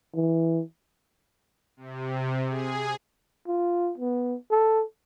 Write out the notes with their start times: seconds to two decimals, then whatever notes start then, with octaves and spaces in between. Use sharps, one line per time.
0.15 E3
1.77 C3
2.50 G#4
3.47 F4
3.98 B3
4.51 A4